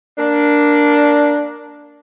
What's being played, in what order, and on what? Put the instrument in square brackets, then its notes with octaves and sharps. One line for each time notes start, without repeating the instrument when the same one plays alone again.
[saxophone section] A#3 D4